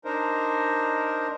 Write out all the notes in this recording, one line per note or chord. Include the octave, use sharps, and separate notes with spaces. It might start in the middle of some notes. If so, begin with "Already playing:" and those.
D4 D#4 A#4 C5